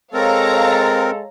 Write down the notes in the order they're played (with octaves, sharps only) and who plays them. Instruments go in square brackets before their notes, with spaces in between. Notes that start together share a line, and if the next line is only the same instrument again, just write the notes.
[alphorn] G#3 [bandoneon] C4 A#4 [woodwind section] A4 [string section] C#5 F5 A#5